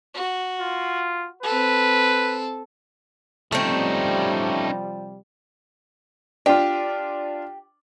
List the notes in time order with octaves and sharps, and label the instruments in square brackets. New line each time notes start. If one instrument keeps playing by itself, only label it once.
[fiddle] F#4
[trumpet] F4
[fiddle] C4 A4 [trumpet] B4
[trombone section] C3 F3 G3 [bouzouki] A3 C4 [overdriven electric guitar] C#4 D#4
[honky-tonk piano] D4 F4 [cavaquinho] G4